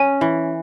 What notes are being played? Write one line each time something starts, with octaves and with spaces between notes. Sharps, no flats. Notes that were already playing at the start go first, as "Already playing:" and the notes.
Already playing: C#4 G#5
E3